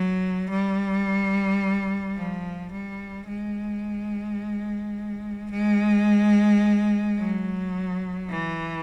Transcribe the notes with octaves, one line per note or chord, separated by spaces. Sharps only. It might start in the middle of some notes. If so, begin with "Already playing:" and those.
Already playing: F#3
G3
F3
G3
G#3
G#3
F#3
E3